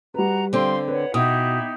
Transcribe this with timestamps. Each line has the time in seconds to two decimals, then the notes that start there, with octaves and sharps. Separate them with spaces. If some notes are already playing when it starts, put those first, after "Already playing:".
0.14 G3 F#4 B4 A#5
0.53 D3 C4 F5 G5 C6
0.88 B4 C#5 F#5
1.14 B2 D#4 E4 G4 D#6